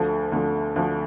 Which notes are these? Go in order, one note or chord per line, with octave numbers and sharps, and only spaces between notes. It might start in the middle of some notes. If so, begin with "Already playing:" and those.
Already playing: D2 D3 F3 A3
D2 D3 F3 A3
D2 D3 F3 A3